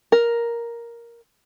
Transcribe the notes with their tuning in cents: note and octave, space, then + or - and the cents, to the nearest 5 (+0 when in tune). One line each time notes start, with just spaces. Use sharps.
A#4 +5